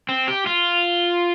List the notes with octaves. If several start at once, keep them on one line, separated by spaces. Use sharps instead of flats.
C4
G4
F4